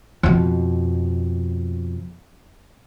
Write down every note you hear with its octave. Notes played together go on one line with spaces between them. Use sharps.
F2 B2